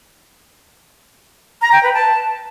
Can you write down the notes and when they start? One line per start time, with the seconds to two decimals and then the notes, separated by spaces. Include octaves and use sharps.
1.62 A#5
1.72 G5
1.83 B4
1.94 A5